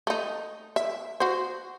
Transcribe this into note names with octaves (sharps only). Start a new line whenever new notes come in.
A3 D#4
E5
F#4 C5